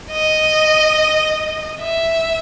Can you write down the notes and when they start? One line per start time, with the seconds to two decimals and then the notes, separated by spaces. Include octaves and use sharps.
0.12 D#5
1.82 E5